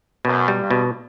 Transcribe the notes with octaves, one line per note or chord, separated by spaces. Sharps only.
F#2 B2
G3
G2
B2